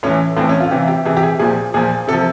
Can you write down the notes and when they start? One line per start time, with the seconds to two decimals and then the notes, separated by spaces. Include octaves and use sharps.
0.03 A2 E3 C#4
0.37 A2 E3 C4
0.49 C#4
0.60 F4
0.71 C3 E3 G4
0.88 G4
1.05 C3 E3 G#4
1.17 G4
1.23 G#4
1.39 A#2 F3 G#4
1.74 A#2 F3 G#4
2.08 C3 A4
2.13 F3